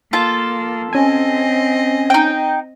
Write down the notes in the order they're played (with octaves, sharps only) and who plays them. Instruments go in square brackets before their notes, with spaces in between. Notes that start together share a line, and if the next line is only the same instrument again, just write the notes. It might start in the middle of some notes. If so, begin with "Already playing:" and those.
[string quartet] A#3 [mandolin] F4 A4
[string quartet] C4 D#5 [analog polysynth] C#4 G#5
[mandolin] D#4 G5